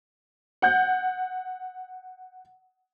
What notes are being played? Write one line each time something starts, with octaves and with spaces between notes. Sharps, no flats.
F#5 G6